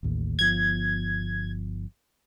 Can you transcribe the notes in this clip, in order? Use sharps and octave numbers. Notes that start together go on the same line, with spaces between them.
A1 D#2 A2
G1 F3 B3 G#6